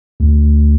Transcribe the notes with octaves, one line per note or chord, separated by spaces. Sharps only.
D2